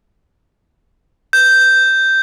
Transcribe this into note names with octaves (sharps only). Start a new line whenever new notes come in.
G6